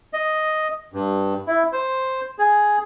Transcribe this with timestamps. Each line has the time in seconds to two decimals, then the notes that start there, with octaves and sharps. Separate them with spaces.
0.13 D#5
0.93 G2
1.47 E4
1.72 C5
2.39 G#4